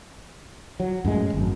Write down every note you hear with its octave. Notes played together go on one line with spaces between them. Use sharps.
F#3
F#2 A2 G#3
G#1 F#2